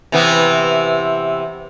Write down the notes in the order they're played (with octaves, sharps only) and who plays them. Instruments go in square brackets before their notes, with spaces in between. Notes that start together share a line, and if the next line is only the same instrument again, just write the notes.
[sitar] C3 E3 B3